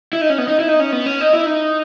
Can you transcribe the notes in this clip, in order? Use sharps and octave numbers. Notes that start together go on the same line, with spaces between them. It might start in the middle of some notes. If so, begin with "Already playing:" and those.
E4
D#4
C#4
B3
D#4
E4
D#4
C#4
B3
C#4
D#4
E4
D#4